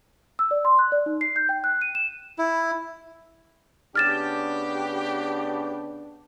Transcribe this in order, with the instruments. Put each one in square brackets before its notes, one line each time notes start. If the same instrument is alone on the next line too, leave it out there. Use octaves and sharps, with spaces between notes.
[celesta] E6
D5
C6
F#6
D5
D#4
C7
G6
G5
F#6
D#7
E7
[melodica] E4
[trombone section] C#3 B3 D4 [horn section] G4 [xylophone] F6 A6 E7